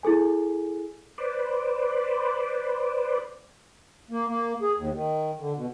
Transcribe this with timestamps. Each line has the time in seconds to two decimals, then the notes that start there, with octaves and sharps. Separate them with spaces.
0.03 E4 G#4 A4 G#5
1.18 B4 C5 D5
4.11 A#3
4.27 A#3
4.62 G#4
4.77 D#2
4.93 D#3
5.40 D3
5.56 B2